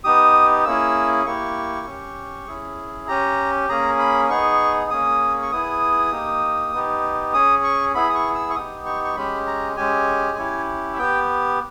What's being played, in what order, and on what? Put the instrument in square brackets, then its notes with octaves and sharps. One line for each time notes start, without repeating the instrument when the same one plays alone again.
[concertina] B3 D#4 G4 D#6
A#3 C#4 E4 G#4 E6
A#3 E4 G4 C#6
C#4 G4
C#4 E4 G#4
C#4 G4 A#5
A#3 C#4 G#4 A#5
B5
B3 D#4 G#4 C#6
A#3 C#4 G#4 D#6
C#6
B3 E4 G#4 D#6
A#3 D#4 G4
B3 D#4 G4
C#4 G#4 D#6
C#6
B3 E4 G#4 B5
D#6
C#6
E6
C#6
B3 D#4 G4 D#6
C#6
C#6
G#3 C#4 G4 B5
A#5
G#3 C#4 G4 G#5
C#4 E4 G4
E5
B3 G4 G5